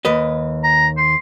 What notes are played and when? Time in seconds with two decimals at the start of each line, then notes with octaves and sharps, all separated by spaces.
0.05 D#2 B4 D#5
0.64 A#5
0.97 C6